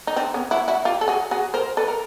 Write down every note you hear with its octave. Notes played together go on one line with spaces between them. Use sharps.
D#4
C4 D4
B3 C#4
E4 F#4
E4 F#4
F4 G4
A4
F#4 G#4
F#4 G#4
A#4 C5
A4 B4
A#4